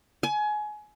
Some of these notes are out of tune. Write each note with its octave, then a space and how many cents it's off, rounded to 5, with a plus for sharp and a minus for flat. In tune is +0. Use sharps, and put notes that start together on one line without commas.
G#5 +25